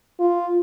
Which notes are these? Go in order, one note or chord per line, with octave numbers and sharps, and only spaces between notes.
F4